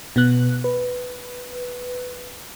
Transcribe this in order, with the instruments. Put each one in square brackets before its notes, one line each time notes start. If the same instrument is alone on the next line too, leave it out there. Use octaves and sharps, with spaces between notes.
[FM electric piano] B2 B3 F#6
B4